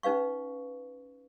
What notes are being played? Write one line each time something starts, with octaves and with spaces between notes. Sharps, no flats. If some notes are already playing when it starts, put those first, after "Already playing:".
C#4 D#4 B4 F5 C#6